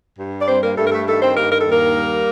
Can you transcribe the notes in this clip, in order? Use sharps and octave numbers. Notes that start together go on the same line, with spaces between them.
G2
D5
G3 C4 C5
A#3 A#4
G2 A3 A4
A#4
A3 A4
D#3 A3 A4
C4 C5
G2 A#3 A#4
A#4
A4
D#2
A#3 A#4
G3